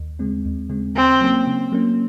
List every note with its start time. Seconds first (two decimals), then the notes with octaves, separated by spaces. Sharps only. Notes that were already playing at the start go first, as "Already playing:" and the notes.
Already playing: D#2
0.19 C#3 G#3 C4
0.45 D#2
0.70 C#3 G#3 C4
0.95 C#3 C4
1.21 F#3 A#3 C#4
1.47 C#3
1.72 F#3 A#3 C#4